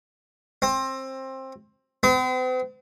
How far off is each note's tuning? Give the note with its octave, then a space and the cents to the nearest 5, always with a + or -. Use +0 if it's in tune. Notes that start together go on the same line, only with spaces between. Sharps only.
C4 +20
C4 -45